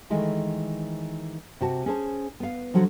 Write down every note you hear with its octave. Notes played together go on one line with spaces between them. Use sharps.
D#3 E3 G#3 A3
C3 F#4 A5
C#4 G#4 C5 A5
B3 F5
D3 F3 F#3 F#4